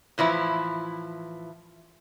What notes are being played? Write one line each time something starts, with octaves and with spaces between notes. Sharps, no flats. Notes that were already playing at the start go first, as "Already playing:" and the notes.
A2 E3 F3 E4